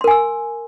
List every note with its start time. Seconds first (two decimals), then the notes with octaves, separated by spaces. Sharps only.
0.01 C6
0.04 A#4
0.08 G#5
0.11 E6